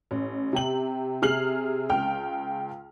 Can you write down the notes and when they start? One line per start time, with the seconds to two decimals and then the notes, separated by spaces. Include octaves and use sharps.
0.11 A1
0.53 C3 G4 F#7
1.22 C3 G#4 F6 C7 F#7
1.89 C#2 G5 F6